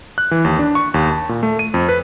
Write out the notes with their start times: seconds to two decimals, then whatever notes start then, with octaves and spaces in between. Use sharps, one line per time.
0.18 F#6
0.31 E3
0.45 D#2
0.59 D4
0.75 C#6
0.94 D#2
1.12 A5
1.29 A#2
1.43 A3
1.59 D#7
1.74 F2
1.89 B4